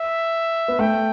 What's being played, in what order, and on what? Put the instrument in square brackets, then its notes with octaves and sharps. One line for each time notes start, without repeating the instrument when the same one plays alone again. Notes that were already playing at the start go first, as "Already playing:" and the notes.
Already playing: [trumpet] E5
[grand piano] B3
[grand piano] A3 [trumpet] G5